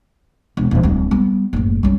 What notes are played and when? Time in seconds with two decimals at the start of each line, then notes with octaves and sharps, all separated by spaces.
0.57 E1
0.71 D#1 F3
0.83 D1 G3
1.11 G3 B3
1.53 F#1 A2
1.83 G3 C#4